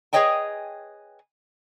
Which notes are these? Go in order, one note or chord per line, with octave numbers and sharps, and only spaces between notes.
G#4 B4 C#5 D#5 G5 G#5